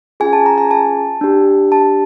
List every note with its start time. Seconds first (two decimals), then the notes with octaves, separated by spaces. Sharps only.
0.20 C#4 F4 G#4 G#5
0.33 A5
0.46 A#5
0.58 G#5
0.71 A5
1.21 D4 G4
1.72 A5